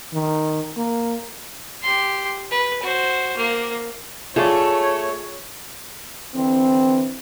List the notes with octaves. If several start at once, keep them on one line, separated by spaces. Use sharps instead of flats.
D#3
A#3
G4 C6
B4
F#4 C5
A#3
A3 F4 G#4 C#5 D5
D3 E3 C4